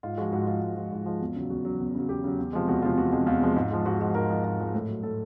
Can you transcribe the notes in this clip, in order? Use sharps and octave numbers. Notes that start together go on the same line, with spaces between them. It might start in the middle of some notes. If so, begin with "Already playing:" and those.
G#2 F4
F3 G#3 F#4
F4
G#2 F#4
F3 G#3 F4
G#2
F3 G#3
G#2 F4
F3 G#3
E2
C#3 F#3
E2 F#4
C#3 F#3
E2
C#3 F#3
E2 G4
C#3 F#3
E2
C3 F3 G#3
E2 F#4
C3 F3 G#3 F4
E2 F#4
C3 F3 G#3
E2 F4
C3 F3 G#3
G#2
F3 G#3
G#2 F#4
F3 G#3 F#4
G#2 A#4
F3 G#3
G#2
F3 G#3
A2
F#3
A2 A4